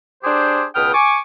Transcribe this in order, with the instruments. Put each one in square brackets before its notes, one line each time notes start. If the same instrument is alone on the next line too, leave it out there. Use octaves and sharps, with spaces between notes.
[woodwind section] D4 G4 G#4 C5
C#2 B2 B4 G5 D#6 F6
G#5 C#6 D6